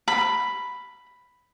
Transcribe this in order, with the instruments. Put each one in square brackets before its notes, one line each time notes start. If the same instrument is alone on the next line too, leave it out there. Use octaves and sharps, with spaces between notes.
[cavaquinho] B5